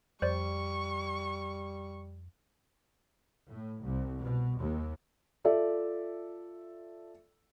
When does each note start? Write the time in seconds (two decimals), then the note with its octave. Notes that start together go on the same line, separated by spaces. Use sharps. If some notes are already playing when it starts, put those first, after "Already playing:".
0.22 F2 G3 C5 D5 C#6
3.49 A2
3.83 C2
4.23 B2
4.59 D#2
5.44 F4 A4 D5 E5